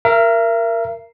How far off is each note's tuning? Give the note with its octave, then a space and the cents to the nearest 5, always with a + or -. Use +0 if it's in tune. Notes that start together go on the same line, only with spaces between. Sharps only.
A#4 +0 E5 +40